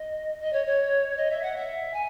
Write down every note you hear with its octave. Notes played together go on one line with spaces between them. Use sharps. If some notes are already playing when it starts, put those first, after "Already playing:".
Already playing: D#5
D#5
C#5
C#5
D#5
E5
F#5
E5
G#5